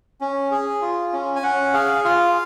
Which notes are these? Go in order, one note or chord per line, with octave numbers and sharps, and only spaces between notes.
C#4
G#4
F4
C#4
G#5
C#4 F#5
G#4 F5
F4 F5